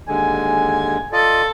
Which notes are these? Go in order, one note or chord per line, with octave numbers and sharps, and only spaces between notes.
D#2 D3 G#3 G#5
F4 A4 D5 D#5